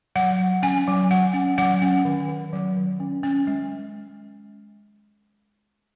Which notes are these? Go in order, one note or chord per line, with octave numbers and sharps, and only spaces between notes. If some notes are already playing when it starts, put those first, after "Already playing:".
F#3 F#5
F#3
C#4 G#5
F#3
F#3 F#5
C#4
F#3 F#5
C#4
D#3
D#3
F#3
D#3
C#4
C#4
G#3